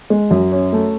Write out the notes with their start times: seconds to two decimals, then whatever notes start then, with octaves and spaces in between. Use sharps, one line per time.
0.10 G#3
0.31 F#2
0.52 C#4
0.73 A3